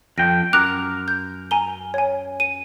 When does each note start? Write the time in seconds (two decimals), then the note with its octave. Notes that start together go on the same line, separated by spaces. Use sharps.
0.18 F2 G5 A#6
0.53 F#2 A#4 D6 F#6 F7
1.08 G6
1.51 G#5 A#5 G7
1.94 C#5 G#5
2.40 D#7